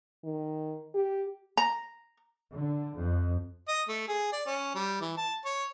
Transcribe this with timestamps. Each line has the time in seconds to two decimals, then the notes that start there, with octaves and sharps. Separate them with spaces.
0.24 D#3
0.95 G4
1.57 A#5
2.54 D3
2.96 F2
3.68 D#5
3.89 A3
4.08 G#4
4.33 D5
4.47 C#4
4.75 G3
5.01 E3
5.17 A5
5.45 C#5